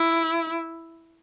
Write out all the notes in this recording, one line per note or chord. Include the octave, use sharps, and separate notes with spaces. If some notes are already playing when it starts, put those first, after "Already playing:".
Already playing: E4